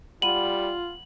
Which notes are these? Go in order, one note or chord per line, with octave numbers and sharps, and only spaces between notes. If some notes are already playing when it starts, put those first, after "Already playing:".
G3 F4 F#5 B5 D#7 F#7